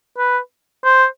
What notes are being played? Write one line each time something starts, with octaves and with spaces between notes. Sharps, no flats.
B4
C5